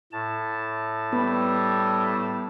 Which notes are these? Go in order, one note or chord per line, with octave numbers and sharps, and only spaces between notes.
A2 A5
G3 A3 B3